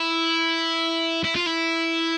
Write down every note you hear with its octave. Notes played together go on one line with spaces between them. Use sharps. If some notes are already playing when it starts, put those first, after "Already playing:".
Already playing: E4
E4
F4
E4